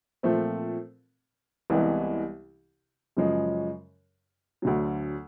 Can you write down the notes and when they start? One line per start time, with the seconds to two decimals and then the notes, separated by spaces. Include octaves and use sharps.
0.23 A#2 F3 A3 C4
1.70 C2 C3 E3 G#3 B3
3.17 F#2 C#3 F3 G#3
4.62 D2 D3 F#3